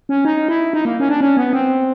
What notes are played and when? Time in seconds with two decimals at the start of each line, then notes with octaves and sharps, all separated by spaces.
0.09 C#4
0.25 D#4
0.48 E4
0.73 D#4
0.85 A#3
1.00 C#4
1.09 D4
1.21 C#4
1.37 B3
1.53 C4